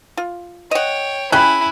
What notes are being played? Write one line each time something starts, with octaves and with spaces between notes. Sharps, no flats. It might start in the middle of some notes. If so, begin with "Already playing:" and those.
F4
C#5 D#5 F#5 G5
C#4 E4 G#4 G5 G#5 B5 F#6